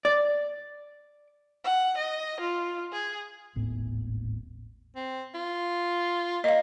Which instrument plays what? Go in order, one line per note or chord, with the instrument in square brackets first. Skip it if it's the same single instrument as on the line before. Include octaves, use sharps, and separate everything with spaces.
[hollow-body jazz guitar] D5
[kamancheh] F#5
D#5
F4
G#4
[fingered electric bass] D#1 G#1 A2 B3
[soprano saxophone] C4
F4
[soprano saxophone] A#3 [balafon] D#5 F5